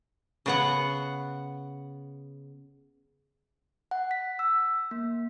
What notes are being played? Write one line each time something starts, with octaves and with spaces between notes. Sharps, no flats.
C#3 B3 F#5
F#5
B6
E6
A#3